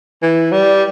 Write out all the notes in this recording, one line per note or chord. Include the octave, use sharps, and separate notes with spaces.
E3
G3